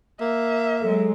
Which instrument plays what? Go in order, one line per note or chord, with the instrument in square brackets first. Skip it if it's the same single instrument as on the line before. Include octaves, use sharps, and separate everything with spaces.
[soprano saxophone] A#3 [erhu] E5
[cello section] F#3 G#3 [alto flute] A4